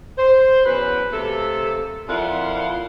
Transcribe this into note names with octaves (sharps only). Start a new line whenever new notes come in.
C5
E2 F#3 C#4 B4
C3 A3 A#3 A4
F2 A#2 E4 F4 F5 F#5